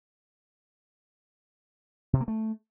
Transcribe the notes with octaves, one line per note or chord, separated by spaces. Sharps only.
C3
A#3
A3